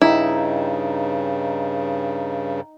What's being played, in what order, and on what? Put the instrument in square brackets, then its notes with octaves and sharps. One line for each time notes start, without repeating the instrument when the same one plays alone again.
[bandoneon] G2 C#3 [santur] D#4 G5 [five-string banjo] E4